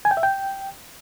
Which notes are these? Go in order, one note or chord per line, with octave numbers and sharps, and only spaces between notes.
G#5
G5
E5
G5